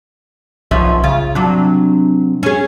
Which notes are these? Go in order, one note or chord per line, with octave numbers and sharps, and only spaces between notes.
B1 F3 C#4 E5
C#3 F4
C3 F#3 D4
C#4 G#4